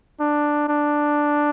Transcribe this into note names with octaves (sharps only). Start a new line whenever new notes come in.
D4
D4